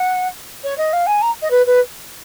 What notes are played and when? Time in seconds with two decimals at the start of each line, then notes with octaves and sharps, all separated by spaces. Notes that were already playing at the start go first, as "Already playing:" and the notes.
Already playing: F#5
0.64 C#5
0.78 D#5
0.93 F5
1.07 G#5
1.22 A#5
1.42 D#5
1.51 B4
1.66 B4